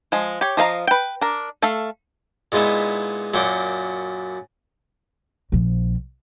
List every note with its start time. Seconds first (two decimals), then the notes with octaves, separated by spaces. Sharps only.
0.12 F3 G#3
0.41 G4 C#5
0.57 F3 D#5 F5 A#5
0.87 B4 G5
1.21 D4 A#4
1.62 A3 A4 F5
2.52 A#2 G#3 B3 D#4 E4
3.34 F#2 A#2 F#4 G5 D6
5.52 A#1 F3